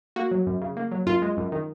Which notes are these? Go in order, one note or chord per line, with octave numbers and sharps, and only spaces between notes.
A#3 F#4
F#3
F#2
C#3
A#3
F#3
F#2 F4
G#3
F#2
D#3